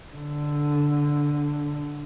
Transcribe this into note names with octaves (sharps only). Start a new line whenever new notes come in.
D3